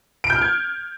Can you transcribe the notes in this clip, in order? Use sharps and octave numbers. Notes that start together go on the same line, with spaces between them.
D7
G6
F6
G#6